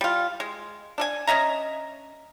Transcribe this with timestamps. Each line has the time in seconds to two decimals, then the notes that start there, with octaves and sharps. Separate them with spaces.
0.01 G3 F4
0.40 G#3
0.98 D4 A4 G#5
1.27 C#4 D#5 E5 A#5